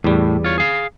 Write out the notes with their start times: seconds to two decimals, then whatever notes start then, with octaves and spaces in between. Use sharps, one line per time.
0.04 E2 A2 G3
0.44 F4 C#5
0.58 G#4 F5